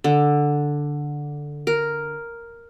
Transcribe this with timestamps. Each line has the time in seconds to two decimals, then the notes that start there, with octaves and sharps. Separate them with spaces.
0.04 D3
1.67 A#4